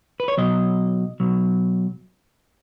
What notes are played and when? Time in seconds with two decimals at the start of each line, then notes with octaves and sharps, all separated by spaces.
0.20 B4
0.28 C#5
0.37 B2 F#3 D#5
1.20 B2 F#3